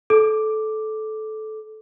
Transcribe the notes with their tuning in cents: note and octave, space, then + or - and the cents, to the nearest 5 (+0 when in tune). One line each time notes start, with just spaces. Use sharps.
A4 -20 D6 +5